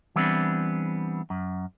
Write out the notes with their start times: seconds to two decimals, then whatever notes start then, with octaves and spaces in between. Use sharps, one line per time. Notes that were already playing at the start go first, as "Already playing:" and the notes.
0.16 E3 G3 B3 C4 D4
1.30 F#2